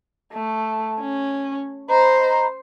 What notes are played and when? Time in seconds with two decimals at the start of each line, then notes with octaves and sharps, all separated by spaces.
0.33 A3
1.00 C#4
1.89 C5 D#5 A#5 B5